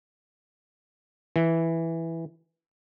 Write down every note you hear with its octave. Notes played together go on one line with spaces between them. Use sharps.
E3